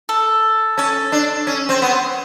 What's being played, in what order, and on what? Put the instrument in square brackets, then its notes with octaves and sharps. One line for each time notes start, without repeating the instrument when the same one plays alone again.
[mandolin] A4
[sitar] C#4 [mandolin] A4
[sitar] D4
C#4
C4
B3